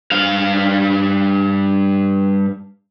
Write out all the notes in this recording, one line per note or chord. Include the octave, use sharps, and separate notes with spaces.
G2 F5